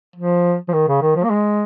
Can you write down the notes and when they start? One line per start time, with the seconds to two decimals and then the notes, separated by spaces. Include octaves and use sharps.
0.16 F3
0.68 F3
0.73 D#3
0.88 C#3
1.02 D#3
1.16 F3
1.24 A#3
1.30 G#3